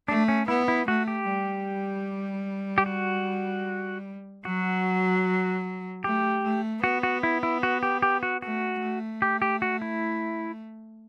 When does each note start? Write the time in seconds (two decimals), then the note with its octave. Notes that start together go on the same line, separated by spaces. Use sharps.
0.08 A3 D4
0.28 C#4
0.48 B3 E4
0.68 E4
0.88 A3 F#4
1.08 G4
1.28 G3
2.78 G4
2.86 F#4
4.45 F#3 F#4
6.04 A3 G4
6.44 A3
6.84 B3 F#4
7.03 F#4
7.23 E4
7.43 E4
7.63 F#4
7.83 G4
8.02 G4
8.23 F#4
8.42 A3 F#4
8.82 A3
9.22 G4
9.42 G4
9.62 F#4
9.82 E4